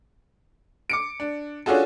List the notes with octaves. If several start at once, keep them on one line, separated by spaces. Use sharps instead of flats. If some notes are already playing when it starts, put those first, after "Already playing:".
D6 C#7 D7
D4
C#4 D4 F4 F#4 G#4 A4